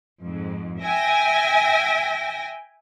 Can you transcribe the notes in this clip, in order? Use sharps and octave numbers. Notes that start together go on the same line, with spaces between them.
F2 G#2
E5 G5 G#5 A#6